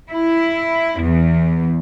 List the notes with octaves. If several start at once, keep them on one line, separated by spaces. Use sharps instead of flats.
E4
E2